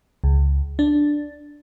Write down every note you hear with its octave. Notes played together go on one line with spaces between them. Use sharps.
C#2
D4